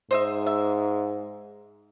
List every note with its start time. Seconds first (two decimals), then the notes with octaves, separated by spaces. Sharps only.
0.11 G#2 C5 D#5 E5
0.46 E5